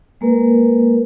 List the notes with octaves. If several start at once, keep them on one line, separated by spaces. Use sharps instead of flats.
G#3 A#3 A#4 B4